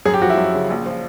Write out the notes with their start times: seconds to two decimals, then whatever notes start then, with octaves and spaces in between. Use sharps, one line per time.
0.05 F#2 G#4
0.14 G4
0.22 F3 F#4
0.30 E4
0.38 F#2
0.54 C#3
0.70 A#1
0.86 F3